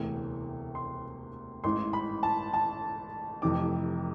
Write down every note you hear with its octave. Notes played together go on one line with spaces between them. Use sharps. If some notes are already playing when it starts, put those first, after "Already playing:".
Already playing: E1 D2 C3 E3
C6
A1 G#2 E3 C6
B5
A5
A5
F1 F2 C3 E3 D6